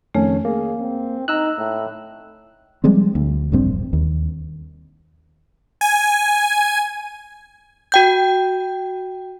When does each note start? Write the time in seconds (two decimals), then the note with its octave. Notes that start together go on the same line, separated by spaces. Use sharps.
0.15 F2 D#3 A3 C#4
0.45 A#3 G#4
0.80 C4
1.28 D#4 A#5 E6 F#6
1.58 A2
2.84 F3 G3 G#3 C4
3.15 D2
3.52 E1 A#1 G2 C4
3.93 D#2
5.81 G#5
7.92 F#4 G5 G6